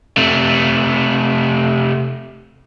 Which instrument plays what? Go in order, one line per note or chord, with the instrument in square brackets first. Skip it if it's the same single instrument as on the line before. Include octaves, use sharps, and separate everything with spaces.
[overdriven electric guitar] C3 A3